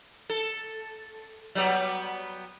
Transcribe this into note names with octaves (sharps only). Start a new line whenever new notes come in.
A4
F#3 G3 B3